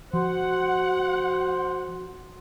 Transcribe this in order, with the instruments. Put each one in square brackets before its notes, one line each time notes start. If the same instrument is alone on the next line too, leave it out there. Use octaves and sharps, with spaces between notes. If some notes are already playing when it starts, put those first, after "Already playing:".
[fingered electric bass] F3 [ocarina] F#4 [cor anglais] C5 [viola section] F#5